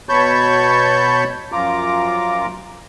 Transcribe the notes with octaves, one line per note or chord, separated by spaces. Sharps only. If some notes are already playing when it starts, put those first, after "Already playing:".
B2 C#5 A5 B5 C#6 G6
F#2 F3 F4 A#5 D6